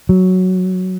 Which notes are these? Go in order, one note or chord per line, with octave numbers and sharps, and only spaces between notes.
F#3